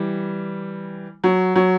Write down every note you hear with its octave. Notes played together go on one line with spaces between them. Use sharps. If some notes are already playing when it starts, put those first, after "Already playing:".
Already playing: E3 G3
F#3
F#3